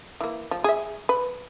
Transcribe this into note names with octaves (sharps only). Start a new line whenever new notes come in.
E3 A#3
F3
G#4 E5
B4